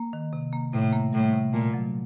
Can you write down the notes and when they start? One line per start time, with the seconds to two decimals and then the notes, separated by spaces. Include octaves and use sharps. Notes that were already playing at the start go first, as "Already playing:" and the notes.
Already playing: A#3
0.13 D#3
0.33 C3
0.53 A#3
0.73 A2 C3
0.93 A#3
1.13 A2 G3
1.33 C3
1.53 A#2 A3
1.74 F#3